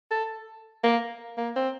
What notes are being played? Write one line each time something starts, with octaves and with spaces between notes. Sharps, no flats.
A4
A#3
A#3
C4